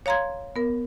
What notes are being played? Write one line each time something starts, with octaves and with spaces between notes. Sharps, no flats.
C#5 F5 A#5 C6 G#6
B3 A#4